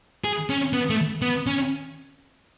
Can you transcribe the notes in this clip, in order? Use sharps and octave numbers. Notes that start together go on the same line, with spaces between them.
G#4
C#4
B3
A3
B3
C#4